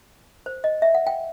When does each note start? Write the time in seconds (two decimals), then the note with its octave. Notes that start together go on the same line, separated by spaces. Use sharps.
0.46 C5
0.64 D#5
0.82 E5
0.95 F#5
1.07 G5